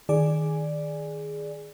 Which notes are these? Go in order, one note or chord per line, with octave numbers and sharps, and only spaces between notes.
D#3 G#4 D5 G#5